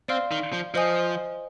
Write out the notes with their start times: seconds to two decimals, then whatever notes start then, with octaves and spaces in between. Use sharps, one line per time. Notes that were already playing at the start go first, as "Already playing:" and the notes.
0.08 C4 D5 F5 C6 F6
0.31 D#3
0.53 F3
0.74 F3 C5 D#5 G#5 D#6